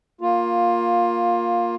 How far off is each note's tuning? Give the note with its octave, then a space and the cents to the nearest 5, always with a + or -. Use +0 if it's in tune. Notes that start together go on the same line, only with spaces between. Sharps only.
A#3 +5 F4 +15